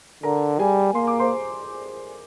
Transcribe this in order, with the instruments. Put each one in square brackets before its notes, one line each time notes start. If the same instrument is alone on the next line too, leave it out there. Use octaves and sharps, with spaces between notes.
[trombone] D3 [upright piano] A#4 A#5
[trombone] G3 [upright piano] G#4 G#5
[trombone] A#3 [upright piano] C6
[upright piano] D6
C5 C6